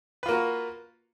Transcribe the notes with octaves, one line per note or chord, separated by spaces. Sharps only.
A#3 F4 F#4 B4